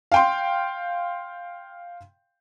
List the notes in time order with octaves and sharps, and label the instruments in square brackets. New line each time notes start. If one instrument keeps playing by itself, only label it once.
[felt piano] F5 G5 C6